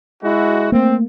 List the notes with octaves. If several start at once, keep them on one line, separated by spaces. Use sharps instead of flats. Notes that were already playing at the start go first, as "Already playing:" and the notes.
G#3 E4 F#4
A3 A#3 C4